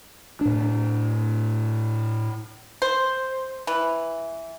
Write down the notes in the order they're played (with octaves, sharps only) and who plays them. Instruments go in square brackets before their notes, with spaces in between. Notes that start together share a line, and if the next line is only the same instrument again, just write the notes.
[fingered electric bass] A2 D4
[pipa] C5
E3